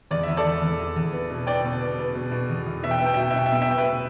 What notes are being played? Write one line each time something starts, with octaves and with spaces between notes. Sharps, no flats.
E2 D5
E2 E5
A4 D5
E2
E2
E2
E2
B3
B2
B3 D5 G5
B2
B3
B3
B2
B2
E2
E2
B2 E5
G5
B3 E5
G5
B2 E5
G5
B2 E5
G5
E5
B2 G5
E5
B3 G5
B4 E5
B3